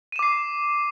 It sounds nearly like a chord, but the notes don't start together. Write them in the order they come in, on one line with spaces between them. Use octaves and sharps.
D#7 E7 D6 C7